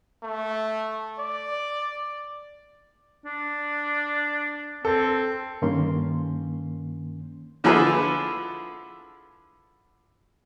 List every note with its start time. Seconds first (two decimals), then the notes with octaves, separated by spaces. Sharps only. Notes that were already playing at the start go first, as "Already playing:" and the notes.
0.23 A3
1.18 D5
3.26 D4
4.85 C4 A4
5.62 G2 D#3 A#3 C#4 C6
7.64 D3 F3 E4 G#4 A4 B4